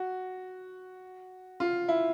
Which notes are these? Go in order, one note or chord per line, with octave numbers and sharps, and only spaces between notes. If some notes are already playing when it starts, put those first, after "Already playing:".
Already playing: F#4
F4
E4